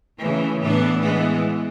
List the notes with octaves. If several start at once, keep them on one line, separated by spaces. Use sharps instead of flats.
C#3 E3 A3
A2 E3 B3 D4
E3 G#3 B3